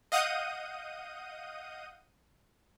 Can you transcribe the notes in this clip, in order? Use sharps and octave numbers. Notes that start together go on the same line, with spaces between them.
D#5 F5 F#5 D#6 G6 D#7